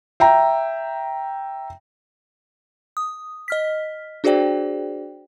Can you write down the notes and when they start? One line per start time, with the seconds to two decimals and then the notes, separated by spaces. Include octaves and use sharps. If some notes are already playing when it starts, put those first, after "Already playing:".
0.20 E5 G5 A#5
2.97 D#6
3.48 D#5 F6 B6
4.24 D4 F#4 G#4 C5 D5 G5